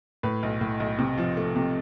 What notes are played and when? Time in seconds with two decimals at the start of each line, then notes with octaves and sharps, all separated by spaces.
0.23 A2 B4
0.43 B1
0.61 A2
0.80 B1
0.99 C3
1.18 F3
1.37 A3
1.56 C3